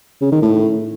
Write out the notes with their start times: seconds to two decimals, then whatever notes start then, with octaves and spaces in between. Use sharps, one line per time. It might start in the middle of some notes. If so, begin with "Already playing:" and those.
0.21 C#3
0.32 D#3
0.42 A2